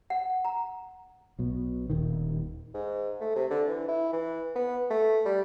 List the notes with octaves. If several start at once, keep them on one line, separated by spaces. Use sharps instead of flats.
F#5
A#5
B1 B2
D#1 D#3
G#2
A3
C3
D3
E3
E4
E3
B3
A3
G3